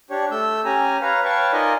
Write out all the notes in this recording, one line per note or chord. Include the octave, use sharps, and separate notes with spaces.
D4 G4 C#5
A3 E6 G6
C#4 G4 G#5 A#5
B4 C#5 F5 A#5
B4 C#5 F5 G5 A5 C#6
D#4 F4 A#4 D5 D#5 G#5